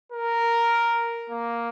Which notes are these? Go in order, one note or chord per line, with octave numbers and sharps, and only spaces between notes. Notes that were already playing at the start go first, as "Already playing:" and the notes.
A#4
A#3